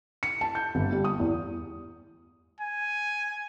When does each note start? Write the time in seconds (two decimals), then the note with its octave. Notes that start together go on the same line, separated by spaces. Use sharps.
0.23 C#7
0.41 A5
0.55 G6
0.75 G1
0.92 G3
1.04 D#6
1.20 E2
2.60 G#5